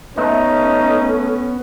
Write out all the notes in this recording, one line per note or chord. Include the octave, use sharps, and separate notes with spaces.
A3 B3 C#4 D#4